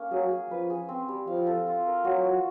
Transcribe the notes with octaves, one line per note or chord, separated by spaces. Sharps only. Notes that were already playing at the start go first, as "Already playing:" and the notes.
Already playing: A#3 C#4
F#3 G#4
G#4
F3 B4
G#4
C4
G3
F3 F5
A4
F4
A#4
F#3 F#4
F3